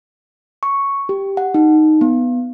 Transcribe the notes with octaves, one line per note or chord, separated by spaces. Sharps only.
C#6
G4
F#5
D#4
B3